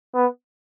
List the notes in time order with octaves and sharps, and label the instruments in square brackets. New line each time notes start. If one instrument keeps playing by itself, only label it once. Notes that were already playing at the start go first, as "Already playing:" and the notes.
[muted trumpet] B3